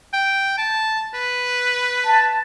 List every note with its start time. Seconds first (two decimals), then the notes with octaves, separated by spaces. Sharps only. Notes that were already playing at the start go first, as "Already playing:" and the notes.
0.13 G5
0.58 A5
1.14 B4
2.04 A5